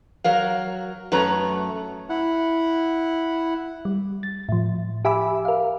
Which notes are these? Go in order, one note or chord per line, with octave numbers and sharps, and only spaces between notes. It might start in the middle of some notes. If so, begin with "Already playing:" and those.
F#3 A#4 F5
F#2 A3 B4 C#5 A#5
E4 F#5
G3
A6
A2 F3
G4 E5 G#5 B5 D6 E6
A#4 F5